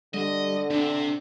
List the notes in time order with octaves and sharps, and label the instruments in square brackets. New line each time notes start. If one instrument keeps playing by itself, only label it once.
[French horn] D3 [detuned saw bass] G3 [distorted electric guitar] D#5
[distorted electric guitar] C3 [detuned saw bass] D4